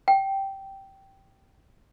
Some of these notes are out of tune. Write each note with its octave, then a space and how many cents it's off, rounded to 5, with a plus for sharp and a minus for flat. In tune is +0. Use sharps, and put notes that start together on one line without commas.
G5 -10